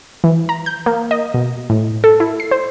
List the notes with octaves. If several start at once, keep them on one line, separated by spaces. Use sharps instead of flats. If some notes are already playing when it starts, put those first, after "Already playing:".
E3
A#5
G6
A#3
D#5
B2
A2
A4
E4
C7
C5